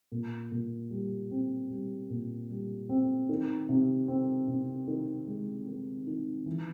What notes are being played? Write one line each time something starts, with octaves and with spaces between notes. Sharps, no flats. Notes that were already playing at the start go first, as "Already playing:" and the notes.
A#2
A#2
G3
C4
G3
A#2
G3
C4
D#3
C3
C4
C3
D#3
G#3
D#3
D#3
E3